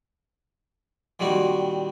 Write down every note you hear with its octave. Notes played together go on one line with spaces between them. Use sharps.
A#2 D#3 G3 C4 F#4